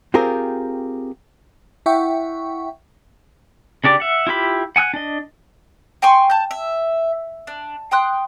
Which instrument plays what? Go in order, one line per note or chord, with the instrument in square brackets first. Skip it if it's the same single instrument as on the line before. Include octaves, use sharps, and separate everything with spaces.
[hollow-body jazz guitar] C4 F4 G4 G#4 A#4
[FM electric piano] E4 E5 F#5 G5 C#6
[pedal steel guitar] C#3 D4 G4 D5
E5 F#5
E4 F4 G4 B5
F#5 G#5 E6 F#6
D4 D#5
[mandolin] G5 G#5 C6 C#6
A5 G6
E5
D4
G5 C6 D#6 F#6